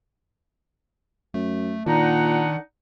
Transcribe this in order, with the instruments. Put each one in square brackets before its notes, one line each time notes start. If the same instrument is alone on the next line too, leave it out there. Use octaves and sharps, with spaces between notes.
[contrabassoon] F#2 [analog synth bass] A3
[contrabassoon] A#2 [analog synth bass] D#3 [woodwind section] D4 D#4 F#5